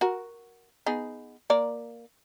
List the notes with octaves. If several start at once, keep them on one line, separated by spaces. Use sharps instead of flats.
F#4 A#4
B3 D#4 G#4
A#3 A#4 D5